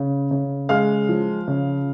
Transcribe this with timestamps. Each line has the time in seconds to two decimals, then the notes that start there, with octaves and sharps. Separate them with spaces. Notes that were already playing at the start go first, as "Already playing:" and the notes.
Already playing: C#3
0.31 C#3
0.69 G#3 F5 F6
1.09 F3
1.48 C#3